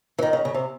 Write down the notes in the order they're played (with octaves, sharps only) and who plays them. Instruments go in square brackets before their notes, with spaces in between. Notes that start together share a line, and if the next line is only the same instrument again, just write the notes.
[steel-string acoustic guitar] E3
D#3
C#3
C#3
C3